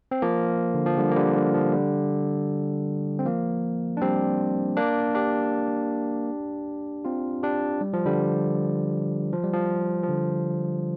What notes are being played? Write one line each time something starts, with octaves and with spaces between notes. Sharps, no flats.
C4
F3 A#3
D3
F3
D3 G3
A#3
D3 G3
D3
F3
D3 G3
C4
F3 A#3
D4
G3 C4
A#3 D4
D4 G4
C4 F4
D4 G4
G3
F3
D3 G3
F3
G3
F3
F3
D3